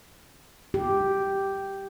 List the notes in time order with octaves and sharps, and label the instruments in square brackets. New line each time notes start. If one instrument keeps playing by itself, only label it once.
[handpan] G4